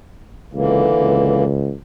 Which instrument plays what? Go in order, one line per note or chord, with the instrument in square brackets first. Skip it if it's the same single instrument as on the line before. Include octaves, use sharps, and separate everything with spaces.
[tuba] C#2 [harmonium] D3 E3 A#3
[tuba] C#2